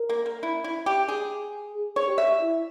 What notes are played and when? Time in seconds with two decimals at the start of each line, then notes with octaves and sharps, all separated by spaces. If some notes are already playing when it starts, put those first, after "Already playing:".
Already playing: A#4
0.09 A#3
0.26 A#3
0.43 E4
0.64 E4
0.86 G4
1.08 G#4
1.74 G#4
1.96 C#5
2.07 G4
2.18 E5
2.40 E4